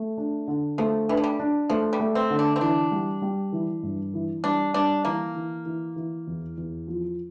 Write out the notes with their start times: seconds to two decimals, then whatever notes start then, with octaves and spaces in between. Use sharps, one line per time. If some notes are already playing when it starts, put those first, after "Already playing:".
Already playing: A3
0.17 D4
0.48 D3
0.78 F3 A3
1.09 E3 D4
1.17 F3
1.24 G3
1.39 D4
1.70 F3 A3
1.93 G3
1.99 A3
2.15 C4
2.30 D3
2.39 D4
2.56 C4
2.61 E3 D4
2.91 G3
3.22 G3
3.53 E3
3.83 G2
4.14 E3
4.44 G3 D4
4.74 G3 D4
5.05 E3 A#3
5.35 E3
5.66 E3
5.96 E3
6.27 E2
6.57 E2
6.88 F3